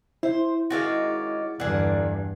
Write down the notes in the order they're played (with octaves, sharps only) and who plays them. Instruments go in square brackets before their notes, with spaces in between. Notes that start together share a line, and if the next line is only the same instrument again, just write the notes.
[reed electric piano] E4 [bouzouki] C5
[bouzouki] D#3 G#3 C#4 [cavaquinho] F#4 D5 F5
[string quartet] E2 G2 [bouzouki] D3 A#3 [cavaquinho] G#4 F#5